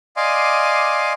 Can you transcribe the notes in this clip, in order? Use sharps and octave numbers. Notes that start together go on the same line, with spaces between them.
D5 D#5 F5 G#5 C6 D6